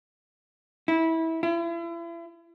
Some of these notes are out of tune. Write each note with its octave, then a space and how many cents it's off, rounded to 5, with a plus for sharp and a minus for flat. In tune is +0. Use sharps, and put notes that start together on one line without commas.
E4 -20
E4 +40